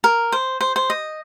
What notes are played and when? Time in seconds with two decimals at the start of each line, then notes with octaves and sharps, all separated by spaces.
0.04 A#4
0.32 C5
0.61 C5
0.76 C5
0.90 D#5